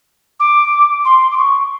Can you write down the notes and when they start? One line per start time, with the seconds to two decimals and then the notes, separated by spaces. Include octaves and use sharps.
0.40 D6
1.05 C6
1.31 D6
1.37 C#6